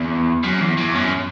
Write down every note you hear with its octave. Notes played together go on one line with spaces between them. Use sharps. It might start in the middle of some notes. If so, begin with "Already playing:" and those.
Already playing: E2
F#2
E2
E2
F#2